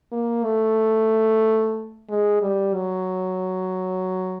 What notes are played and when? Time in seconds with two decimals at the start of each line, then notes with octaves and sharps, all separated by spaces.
0.12 A#3
0.44 A3
2.09 G#3
2.41 G3
2.74 F#3